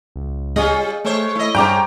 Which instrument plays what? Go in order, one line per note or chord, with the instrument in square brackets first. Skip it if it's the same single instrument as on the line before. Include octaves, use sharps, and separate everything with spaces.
[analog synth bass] C#2
[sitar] G3 C#4 F4 [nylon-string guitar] G#4 D#5
[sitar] G#3 C5 C#5 [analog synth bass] A3
[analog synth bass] A3 [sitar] E4 D#5
[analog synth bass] G2 [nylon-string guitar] G3 C5 [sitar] G#3 C#4 [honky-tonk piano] G5 A#5 D6